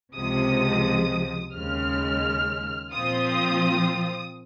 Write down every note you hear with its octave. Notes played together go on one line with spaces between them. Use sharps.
C#2 C3 F3 G#3 D#6
D#2 C#3 G#3 F6
A#2 F3 C4 F4 D#6